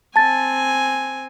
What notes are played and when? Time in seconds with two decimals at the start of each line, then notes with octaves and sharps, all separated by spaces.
0.16 C4 G#5 A5 A6